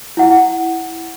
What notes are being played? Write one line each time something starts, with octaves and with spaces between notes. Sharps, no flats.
E4 F#5